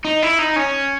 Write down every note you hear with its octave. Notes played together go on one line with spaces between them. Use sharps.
D#4
E4
D#4
C#4